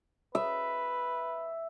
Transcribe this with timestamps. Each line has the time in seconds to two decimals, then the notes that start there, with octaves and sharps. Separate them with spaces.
0.35 B4 E5